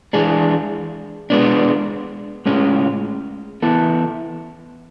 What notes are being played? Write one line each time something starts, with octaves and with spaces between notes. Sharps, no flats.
E3 G#3 D4 G#4
G#3 B3 D4
A2 G#3 C#4
E3 B3 E4 A4